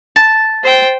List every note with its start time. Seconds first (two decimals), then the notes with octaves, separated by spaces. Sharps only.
0.16 A5
0.63 C5 G5